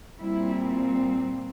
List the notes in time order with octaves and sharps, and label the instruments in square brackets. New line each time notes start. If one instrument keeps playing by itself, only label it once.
[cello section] A#2 G3 C4 E4